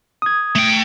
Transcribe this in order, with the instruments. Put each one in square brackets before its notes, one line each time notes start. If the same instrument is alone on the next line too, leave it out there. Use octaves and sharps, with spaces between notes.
[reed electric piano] D#6 G#6
[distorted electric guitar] A3 G5